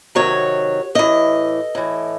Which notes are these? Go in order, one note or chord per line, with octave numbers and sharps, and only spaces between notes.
C3 D#3 F#3 C#5
A2 E3 D#5
A2 E3